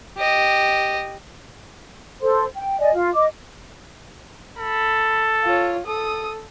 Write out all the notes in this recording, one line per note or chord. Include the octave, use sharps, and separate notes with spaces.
G4 D#5
A4 C5 C6
G5
D5 D#5 G#5
F4
D#5 D6
A4 B5
F4 C#5
A4 D#6